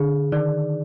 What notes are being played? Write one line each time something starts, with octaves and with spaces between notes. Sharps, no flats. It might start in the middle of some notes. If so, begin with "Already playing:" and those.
Already playing: D3 G#4
D#3 D5